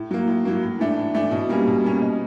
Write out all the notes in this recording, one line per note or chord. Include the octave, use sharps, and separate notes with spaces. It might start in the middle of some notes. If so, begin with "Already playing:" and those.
Already playing: A2
F#3 A#3
A2
F#3 A#3
A2
E3 A3 D4
A2
E3 A3 D4
B2
G3 A#3 C#4
B2
G3 A#3 C#4
B2